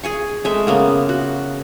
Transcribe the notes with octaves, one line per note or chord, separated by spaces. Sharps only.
G#4 G#5 C#6
G#3 A3 E5
C#3 A#3 B3
F#4